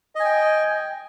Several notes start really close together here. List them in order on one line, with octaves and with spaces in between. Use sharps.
D#5 G#5 G5